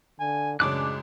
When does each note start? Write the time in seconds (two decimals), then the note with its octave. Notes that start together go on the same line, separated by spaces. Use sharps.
0.20 D3 G#5
0.60 A1 F#2 C#3 G#3 D4 D6 F#6